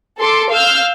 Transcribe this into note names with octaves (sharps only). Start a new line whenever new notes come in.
A4 C6 D6
F5 E6 F6 G6